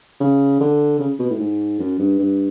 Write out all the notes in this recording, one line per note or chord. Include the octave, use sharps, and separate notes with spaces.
C#3
D3
C#3
B2
A2
G#2
F#2
G2
G2